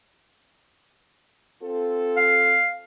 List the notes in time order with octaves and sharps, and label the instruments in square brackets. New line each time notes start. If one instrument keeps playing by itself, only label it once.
[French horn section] C4 F4 A4
[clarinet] F5